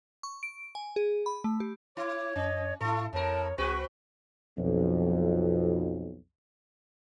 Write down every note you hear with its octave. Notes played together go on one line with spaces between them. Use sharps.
C#6
D7
G#5
G#4
B5
A3
G4
E4 C#5 D6
F#2 C#4 D#5
A2 E4 A4 F5 C#6
F2 A2 A#4 C#5 A5
C#2 C4 F#4 G#4 B4 C#6
B1 F2